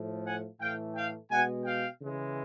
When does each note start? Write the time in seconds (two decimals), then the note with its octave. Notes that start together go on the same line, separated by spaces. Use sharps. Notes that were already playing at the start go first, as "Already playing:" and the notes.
Already playing: A2 F3 A3
0.26 F#5 G#5
0.61 A2 E3 A3 F5 G5
0.96 F5 G5
1.31 B2 G#3 F#5 G#5
1.66 F5 G5
2.00 C#3 E3 G#3